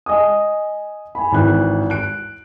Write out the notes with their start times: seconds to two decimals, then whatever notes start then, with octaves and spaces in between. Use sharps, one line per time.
0.06 D#5 G#5 D#6
1.15 G#5 B5
1.32 G#1 E3 F#6
1.90 F#6 D7